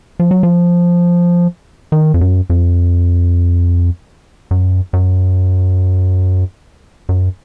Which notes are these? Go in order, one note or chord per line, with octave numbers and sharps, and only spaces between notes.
F3
F#3
F3
D#3
F2
F#2
F2
F#2
F#2
F#2